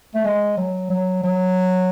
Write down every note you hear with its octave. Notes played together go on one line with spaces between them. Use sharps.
A3
G#3
F#3
F#3
F#3